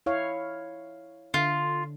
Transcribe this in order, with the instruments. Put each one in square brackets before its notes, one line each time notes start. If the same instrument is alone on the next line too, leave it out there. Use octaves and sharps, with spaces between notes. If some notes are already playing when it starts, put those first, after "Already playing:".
[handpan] E4 C#5 F5
[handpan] D3 [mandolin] F4